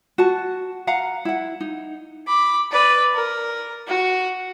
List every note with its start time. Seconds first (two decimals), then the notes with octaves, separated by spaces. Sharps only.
0.18 F#4 A5
0.87 F5 F#5 A#5
1.25 E4 F#5
1.60 D#4
2.27 B5 D6
2.72 B4 D5
3.14 A#4
3.87 F#4